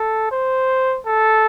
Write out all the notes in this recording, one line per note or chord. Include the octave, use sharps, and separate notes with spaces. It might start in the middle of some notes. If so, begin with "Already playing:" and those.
Already playing: A4
C5
A4